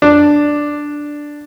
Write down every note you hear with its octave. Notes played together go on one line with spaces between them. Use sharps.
D4